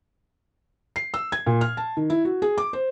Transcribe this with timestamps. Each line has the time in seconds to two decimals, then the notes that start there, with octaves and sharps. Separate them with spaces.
0.96 C7
1.14 E6
1.32 G#6
1.47 A#2
1.61 F6
1.77 A5
1.97 D#3
2.10 E4
2.25 F#4
2.42 G#4
2.58 D6
2.73 C5